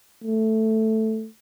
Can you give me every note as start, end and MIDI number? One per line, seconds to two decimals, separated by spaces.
0.24 1.27 57